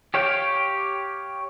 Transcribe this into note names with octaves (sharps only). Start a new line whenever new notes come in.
G4 C#5 F5 G5